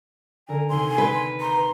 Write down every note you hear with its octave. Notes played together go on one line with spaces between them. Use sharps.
D3 A#4 G#5 A#5
D#2 C3 G#5 C6
B4
A#5 C6